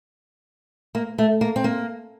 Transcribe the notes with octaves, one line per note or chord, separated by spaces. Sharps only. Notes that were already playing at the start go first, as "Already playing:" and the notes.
A#3
A3
A#3
C4
A#3